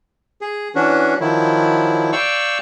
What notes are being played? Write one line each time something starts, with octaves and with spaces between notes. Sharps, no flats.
G#4
E3 C#4 D4 F#4
D#3 F3 F#3 E4
D5 F5 G5 C#6 E6